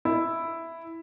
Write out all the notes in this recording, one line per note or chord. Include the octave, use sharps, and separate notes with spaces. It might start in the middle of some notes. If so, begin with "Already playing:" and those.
E4